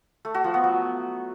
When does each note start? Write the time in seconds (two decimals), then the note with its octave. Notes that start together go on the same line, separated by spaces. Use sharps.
0.25 A3
0.34 F#4
0.44 F3
0.54 B3
0.64 F#3